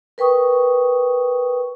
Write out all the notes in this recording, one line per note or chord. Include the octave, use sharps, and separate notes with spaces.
A#4 B4 G5 C#6 D#6